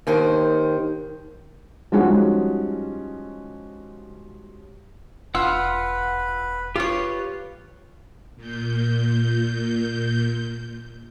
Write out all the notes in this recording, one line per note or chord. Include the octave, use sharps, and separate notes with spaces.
D#2 D#3 C5
F3 G3 G#3 C#4 D#4 F#4
E1 F4 B4 F#5 E6
F4 G4 B4 C#5
A#2 G6